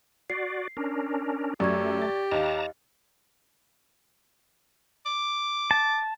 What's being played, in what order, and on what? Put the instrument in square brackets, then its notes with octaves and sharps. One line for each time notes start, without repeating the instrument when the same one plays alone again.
[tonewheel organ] F#4 D5 [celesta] C7
[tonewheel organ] C#4 D4 A#4
[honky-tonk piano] F#2 [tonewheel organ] A3 [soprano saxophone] G4 [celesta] D5 C#6 G#6
[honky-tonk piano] A6
[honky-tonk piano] D#2 [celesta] D#5 F5 [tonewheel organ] A5 A#5
[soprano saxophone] D6
[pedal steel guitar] A5